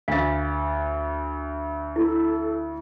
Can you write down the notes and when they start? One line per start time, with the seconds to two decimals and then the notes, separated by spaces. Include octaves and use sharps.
0.08 D2 F5 A6
1.96 E4 A4